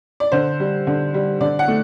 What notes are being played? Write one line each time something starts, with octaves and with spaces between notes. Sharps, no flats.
D5
D3 C5
G3
D3
G3
D3 D5
F#5
A3